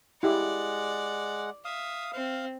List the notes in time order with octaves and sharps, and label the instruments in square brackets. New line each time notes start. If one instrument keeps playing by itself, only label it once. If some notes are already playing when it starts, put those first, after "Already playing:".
[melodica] G#3 F#5 [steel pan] E4 G4 [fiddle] D5
[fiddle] E5 [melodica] F5 D#6
[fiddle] C4 [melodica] F5